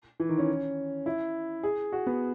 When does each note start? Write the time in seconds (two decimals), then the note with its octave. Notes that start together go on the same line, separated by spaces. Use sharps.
0.20 E3
0.29 D#3
0.39 C#4
1.06 E4
1.63 G#4
1.92 F#4
2.07 B3